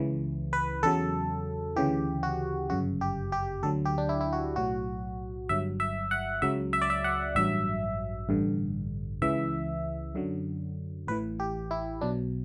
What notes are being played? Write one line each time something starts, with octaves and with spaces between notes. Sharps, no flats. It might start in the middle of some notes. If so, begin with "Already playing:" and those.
Already playing: C#2 C#3 E3
B4
E2 C#3 F#3 A4
D2 C#3 E3 G4
F#4
G1 F#2 C#3 F#4
G4
G4
D2 D3 F#3 A4
G4
D4
E4
E4
F#4
B1 A2 F#3 F#4
G1 G2 F#3 E5
E5
F#5
C#2 C#3 F#3 E5
E5
D5
E5
F#5
A1 G2 F#3 E5
A1 G2 D3
C#2 C#3 E3 E5
F#2 D3 F#3
A1 A2 E3 B4
G4
E4
B1 B2 F#3 D4